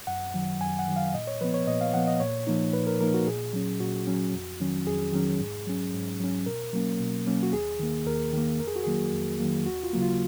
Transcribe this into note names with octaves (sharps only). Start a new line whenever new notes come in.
F#2 F#5
D#3 F#3
F#2 G#5
F#5
D#3 F#3
F5
A#2 D#5
C#5
F3 B3 B4
C#5
A#2 D#5
F5
F3 B3 F#5
D#5
A#2 C#5
F3 A#3 D#4
A#2 B4
A#4
F3 A#3 D#4 A#4
F#4
A#2 G#4
F#3 C#4
A#2 F#4
F#3 C#4
F2
D#3 F#3 C#4
F2 G#4
D#3 F#3 C#4
G#2
F#3 C#4
G#2
F#3 C#4
B2 A#4
F#3 A#3 C#4
B2
F#3 A#3 C#4
F#4
D#2 G#4
D#3 A#3
D#2 A#4
D#3 A#3
F2 A#4
G#4
F#4
D#3 F#3 A#3 G#4
F2
D#3 F#3 A#3
D#2 F#4
F4
C#3 F#3 A#3
F4